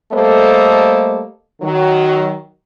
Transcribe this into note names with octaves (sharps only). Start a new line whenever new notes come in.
G3 A3 A#3 A4 C5 D#5
D#3 F#3